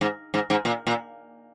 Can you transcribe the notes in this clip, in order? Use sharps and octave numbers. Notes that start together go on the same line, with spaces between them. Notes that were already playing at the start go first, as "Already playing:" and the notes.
G#2
G#2
G#2
A#2
A#2